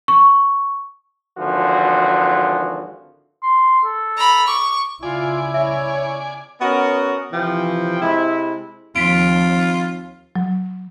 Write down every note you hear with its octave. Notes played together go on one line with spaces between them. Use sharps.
C#6
G#1 D3 E3 F3 F#4
C6
A4
A#5 B5
C#6 D6
C#3 E4 F4 D5 G#5
C#5 E5
B3 C#4 F#4 A#4 D#5
C3 E3 F3 G5
C3 G#3 E4
D#2 F3 C4 F4 B6 D7
F#3